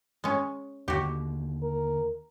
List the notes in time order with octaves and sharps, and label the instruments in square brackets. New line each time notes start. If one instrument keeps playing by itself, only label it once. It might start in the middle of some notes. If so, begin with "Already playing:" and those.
[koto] G#3 C#4
[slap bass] D#2 D3 [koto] F#4 G4
[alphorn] A#4